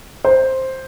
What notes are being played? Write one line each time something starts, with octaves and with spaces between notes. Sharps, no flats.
C5